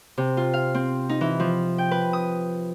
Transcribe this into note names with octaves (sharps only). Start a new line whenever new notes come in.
C3
F4
F5
C4
D#4
E3
F3
G5
B4
D#6